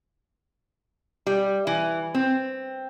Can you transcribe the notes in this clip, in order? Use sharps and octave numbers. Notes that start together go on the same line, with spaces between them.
G3
E3
C4